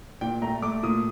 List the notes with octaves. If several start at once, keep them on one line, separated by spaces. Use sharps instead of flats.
A#2 G5
A3 A#5
A3 D6
A#2 D#6